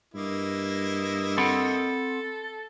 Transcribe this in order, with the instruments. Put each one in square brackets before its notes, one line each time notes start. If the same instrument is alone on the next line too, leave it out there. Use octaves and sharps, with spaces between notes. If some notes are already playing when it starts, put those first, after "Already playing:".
[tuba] G2 [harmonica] A#3 E4 D#5
[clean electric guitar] C4 F#5 B5 [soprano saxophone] A4